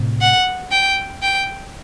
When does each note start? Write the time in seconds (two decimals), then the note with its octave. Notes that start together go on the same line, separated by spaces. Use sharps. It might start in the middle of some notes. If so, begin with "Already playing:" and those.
Already playing: A2 C3
0.21 F#5
0.72 G5
1.22 G5